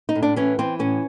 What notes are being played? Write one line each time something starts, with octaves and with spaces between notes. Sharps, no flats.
D#4
A2
D4
E3 C#4
E3 C4
A2 C#4